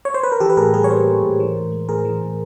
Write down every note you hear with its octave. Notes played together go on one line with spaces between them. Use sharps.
C#5
C5
B4
A#4
E3 G4 A4
B4
A2 G#4 A#4
G3 G#4 A#4
C#5
A#3 A#4 C5
E3
A2
E3
A2
G#3
A2 G#4 A#4
E3
A2